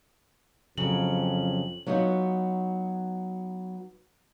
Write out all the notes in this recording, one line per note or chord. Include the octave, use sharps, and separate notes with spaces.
F2 C#3 F#3 F#7
F#3 B3 D#4 F4 F#4